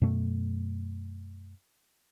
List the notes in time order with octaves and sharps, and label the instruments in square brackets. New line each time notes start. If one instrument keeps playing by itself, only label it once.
[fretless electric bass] F#2 B2 A3